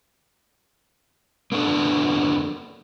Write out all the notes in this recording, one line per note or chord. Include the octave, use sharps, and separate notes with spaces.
A#3 B3 D4 A4